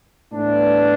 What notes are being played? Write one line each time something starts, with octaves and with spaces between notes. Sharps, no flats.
A2 E3 B3 D4